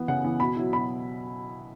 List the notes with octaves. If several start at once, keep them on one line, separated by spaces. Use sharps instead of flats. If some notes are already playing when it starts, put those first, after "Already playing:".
Already playing: E3 B3
C#3 F#5
E3 B3
B2 B5
F#3 E4
B2 B5